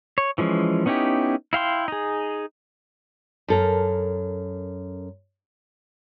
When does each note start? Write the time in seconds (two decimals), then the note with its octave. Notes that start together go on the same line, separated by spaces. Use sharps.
0.18 C#5
0.38 E3 F3 G#3 C#4
0.86 B3 C#4 D#4 E4 G4
1.53 E4 F5 G5 C6
1.88 D#4 G#4
3.48 F#2 A4 A#4